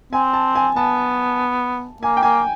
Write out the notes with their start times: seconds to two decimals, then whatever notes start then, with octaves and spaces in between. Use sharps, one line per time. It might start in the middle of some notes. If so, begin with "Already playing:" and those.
0.13 C4 G#5
0.33 A5
0.55 G#5
0.76 B3 A5
2.02 A#3 G#5
2.17 G5
2.23 A#3 G#5